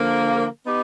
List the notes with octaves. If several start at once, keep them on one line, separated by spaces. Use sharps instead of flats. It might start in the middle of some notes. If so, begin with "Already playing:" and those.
Already playing: D3 F3 A#3
B3 D#4 G4